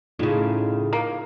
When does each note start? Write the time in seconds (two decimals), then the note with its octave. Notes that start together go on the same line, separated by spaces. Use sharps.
0.19 A2 C#3 D#4 F4
0.93 A#3